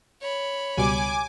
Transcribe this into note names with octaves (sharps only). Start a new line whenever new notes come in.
C#5 B5
C#2 B2 G3 G#5 D6